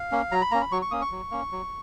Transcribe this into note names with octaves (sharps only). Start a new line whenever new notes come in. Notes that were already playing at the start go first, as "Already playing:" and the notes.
Already playing: F5
A#3 C#4
F#3 A#5
B5
A#3 C#4 A#5
B5
F#3 C#6
C#6
A#3 C#4 D#6
C#6
F#3
A#3 C#4
F#3